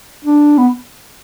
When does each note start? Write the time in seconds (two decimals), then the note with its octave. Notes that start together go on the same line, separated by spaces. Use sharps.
0.25 D4
0.58 B3